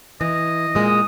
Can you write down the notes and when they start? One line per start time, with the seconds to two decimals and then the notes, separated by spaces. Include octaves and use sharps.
0.21 E3 D#5
0.75 A#2 G#3 D#6